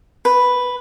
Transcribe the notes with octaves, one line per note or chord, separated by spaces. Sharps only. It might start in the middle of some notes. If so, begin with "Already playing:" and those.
B4